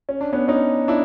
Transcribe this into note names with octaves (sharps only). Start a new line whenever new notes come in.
C#4
D4
B3 C#4
C#4 D#4
D4 E4